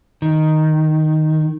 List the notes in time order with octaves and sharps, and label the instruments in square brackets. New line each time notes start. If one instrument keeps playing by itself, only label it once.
[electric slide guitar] D#3